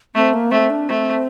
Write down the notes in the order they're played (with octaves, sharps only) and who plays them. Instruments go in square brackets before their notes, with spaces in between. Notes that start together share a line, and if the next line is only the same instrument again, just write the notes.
[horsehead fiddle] A3 [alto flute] C4
[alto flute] A#3
[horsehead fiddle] A3 [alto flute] C4
[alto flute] D4
[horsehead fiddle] A3 [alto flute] C4